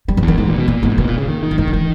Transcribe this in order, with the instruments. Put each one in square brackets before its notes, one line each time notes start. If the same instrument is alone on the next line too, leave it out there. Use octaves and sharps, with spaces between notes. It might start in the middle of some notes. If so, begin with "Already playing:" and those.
[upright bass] G3
E3
[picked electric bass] E2
[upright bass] D#3
[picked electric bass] G#2 [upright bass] E3
[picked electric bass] A#2
B2
[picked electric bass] A#2 [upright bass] A#3
[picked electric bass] G#2 [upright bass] B3
[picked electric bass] B2 [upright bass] A#3
[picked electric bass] A#2
C#3
D#3
D#3
[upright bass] A#3
[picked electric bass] D#3 [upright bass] G#3
[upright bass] G3
[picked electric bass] D#3 [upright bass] E3